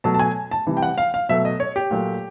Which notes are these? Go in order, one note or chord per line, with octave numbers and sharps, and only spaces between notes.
B2 F#3 A3 A5
A5
G#5
A5
C3 E3 G3
G5
F#5
F5
F5
B2 F#3 A3 E5
D#5
C#5
G4
A#2 F#3 A3